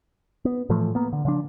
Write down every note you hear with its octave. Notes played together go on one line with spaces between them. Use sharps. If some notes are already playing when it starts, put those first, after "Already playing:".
B3
A2 E3 F3 A3
A#3 B3
D3
C#3 F3 D4